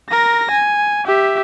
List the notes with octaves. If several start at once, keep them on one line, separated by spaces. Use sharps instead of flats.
A#4 A#6
G#5
G4 E5